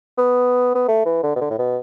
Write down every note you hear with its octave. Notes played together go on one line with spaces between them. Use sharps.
B3
B3
A3
E3
D3
B2
D3
A2
B2